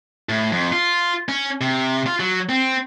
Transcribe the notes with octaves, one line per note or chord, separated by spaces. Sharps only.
A2
F2
F4
C#4
C3
F4
F#3
C4